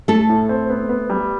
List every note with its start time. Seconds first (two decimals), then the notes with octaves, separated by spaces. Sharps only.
0.08 A2 A3 A4
0.29 A2
0.49 C4
0.69 B3
0.89 B3
1.10 G3